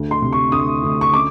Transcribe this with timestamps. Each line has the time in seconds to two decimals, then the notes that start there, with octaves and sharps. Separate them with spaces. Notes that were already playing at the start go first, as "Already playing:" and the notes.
Already playing: D2
0.11 C6
0.22 C3
0.32 C#6
0.52 D2 D#6
0.83 D2
1.01 C#6
1.13 C#4 D6